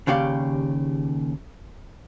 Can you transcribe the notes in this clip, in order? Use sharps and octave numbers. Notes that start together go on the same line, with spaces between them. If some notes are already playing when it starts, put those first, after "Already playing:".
D#2 C#3 G4 D5 F5